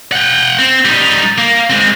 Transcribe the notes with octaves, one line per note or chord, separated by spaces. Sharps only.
F#5 G5
C4
G3 D#4
A#3
G#3 C4